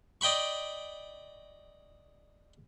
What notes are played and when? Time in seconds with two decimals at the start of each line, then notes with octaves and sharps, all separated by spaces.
0.21 D5 D#5 G5 B5 C#6